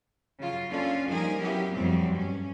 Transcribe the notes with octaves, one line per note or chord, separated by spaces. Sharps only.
C#3 F#3 F4
A#3 C#4 D4 F4 A4
F3 G3 A#3 D#4 G#4 A#4
F#3 B3 C#4 E4 G4
F2 A#2 E3 F#3 G3 C4
G2 C#4